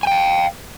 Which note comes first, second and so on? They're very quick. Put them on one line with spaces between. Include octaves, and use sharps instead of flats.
G#5 G5 F5